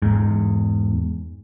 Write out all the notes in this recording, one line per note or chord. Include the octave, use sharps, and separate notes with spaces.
E2 G#2